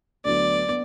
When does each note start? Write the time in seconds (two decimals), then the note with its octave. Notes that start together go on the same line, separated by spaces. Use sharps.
0.25 D2 D3 F#3 B3 D5
0.68 B3 D4